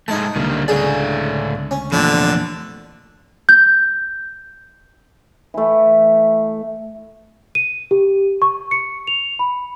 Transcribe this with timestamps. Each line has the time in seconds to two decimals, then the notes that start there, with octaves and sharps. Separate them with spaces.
0.08 G#2 G#3 A3 D#4 A5
0.36 C#2 D3 D#3 G3 A#3
0.68 A2 C#3 G#4 A4 D5
1.71 C#4
1.92 E2 A#2 D3 F3 A3 C#6
3.49 G6
5.54 E3 A3
7.55 D#7
7.91 G4
8.42 C#6
8.71 C#7
9.07 F7
9.39 B5